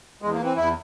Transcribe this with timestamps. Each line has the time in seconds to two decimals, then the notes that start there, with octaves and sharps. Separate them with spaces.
0.22 E2 G#3
0.34 A#3
0.40 E3
0.45 C4
0.57 E2 E4